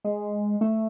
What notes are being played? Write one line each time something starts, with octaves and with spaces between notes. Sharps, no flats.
G#3
A3